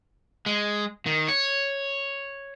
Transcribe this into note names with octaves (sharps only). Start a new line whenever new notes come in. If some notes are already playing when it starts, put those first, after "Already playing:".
G#3
D#3
C#5